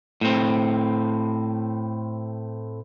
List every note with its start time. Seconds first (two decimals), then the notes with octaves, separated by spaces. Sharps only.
0.21 A2 C4